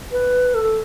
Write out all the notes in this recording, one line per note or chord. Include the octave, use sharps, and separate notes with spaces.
B4
A4